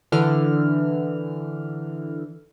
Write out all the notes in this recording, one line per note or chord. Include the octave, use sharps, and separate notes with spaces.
D3 E3 F6